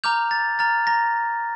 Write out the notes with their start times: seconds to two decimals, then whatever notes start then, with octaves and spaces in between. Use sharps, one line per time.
0.04 A#5 D6 F6 G6 F7
0.31 A6
0.59 A#5 F6 A6
0.87 A#5 A#6